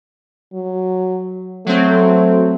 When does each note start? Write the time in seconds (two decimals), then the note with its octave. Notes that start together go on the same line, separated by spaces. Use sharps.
0.53 F#3
1.66 F#3 A3 C4